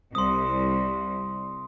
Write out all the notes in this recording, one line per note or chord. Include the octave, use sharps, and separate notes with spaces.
C2 C6 D#6